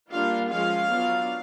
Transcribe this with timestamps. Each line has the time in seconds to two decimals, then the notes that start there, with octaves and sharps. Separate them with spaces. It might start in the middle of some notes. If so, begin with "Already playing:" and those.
0.10 G3 A#3 D4 F4 F5
0.50 F3 G#3 C#4 F4 F5
0.90 F#3 B3 D4 F4